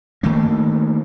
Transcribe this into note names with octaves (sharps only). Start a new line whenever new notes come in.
D#3 A3 A#3